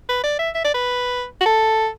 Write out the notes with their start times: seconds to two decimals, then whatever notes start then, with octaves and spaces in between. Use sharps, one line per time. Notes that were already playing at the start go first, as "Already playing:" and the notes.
0.09 B4
0.23 D5
0.39 E5
0.54 E5
0.64 D5
0.74 B4
1.41 F#4
1.46 A4